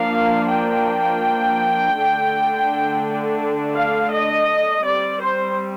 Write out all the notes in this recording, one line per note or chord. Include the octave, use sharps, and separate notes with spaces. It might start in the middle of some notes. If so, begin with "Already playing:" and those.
Already playing: F3 A#3 D4 F5
G5
D3 A3 D4
F5
D#5
G3 C4 D5
C5